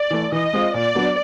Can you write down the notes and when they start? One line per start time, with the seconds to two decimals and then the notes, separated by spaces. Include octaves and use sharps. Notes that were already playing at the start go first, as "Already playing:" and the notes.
Already playing: D5
0.11 E3 A3
0.32 E3 D#5
0.53 G#3 C4 F4
0.74 A#2 D5
0.95 F#3 B3 D4